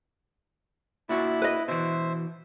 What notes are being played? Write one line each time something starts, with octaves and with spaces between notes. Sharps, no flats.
A#2 D4 E4 F#4
B4 D#5
B2 E3 C5 E5